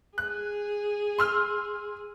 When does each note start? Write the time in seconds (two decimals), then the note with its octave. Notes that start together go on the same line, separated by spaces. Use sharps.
0.18 G#4 F#6
1.19 C6 E6 F6